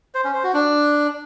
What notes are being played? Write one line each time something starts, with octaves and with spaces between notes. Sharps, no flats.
C5
C#4
C5
F#4
D4